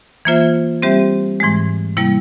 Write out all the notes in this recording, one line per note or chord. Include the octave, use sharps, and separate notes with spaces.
E3 A#3 F4 C5 E5
G3 C4 G4 C5 E5
G#2 E3 G#3
C3 G3 A#3 E4